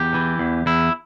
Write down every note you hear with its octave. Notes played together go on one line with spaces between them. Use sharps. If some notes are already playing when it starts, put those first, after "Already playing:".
Already playing: E2 G4
E3
E2
E2 E4